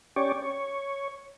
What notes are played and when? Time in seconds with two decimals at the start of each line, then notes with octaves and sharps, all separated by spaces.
0.16 C#4 G4 C#5 D5
0.42 C#5